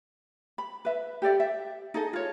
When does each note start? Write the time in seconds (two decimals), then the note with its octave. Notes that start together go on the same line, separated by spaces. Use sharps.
0.58 B5
0.85 B4 E5
1.22 G4 A4 D5 E5
1.40 E5
1.94 D#4 G#4 A4 D#5
2.13 F4 C#5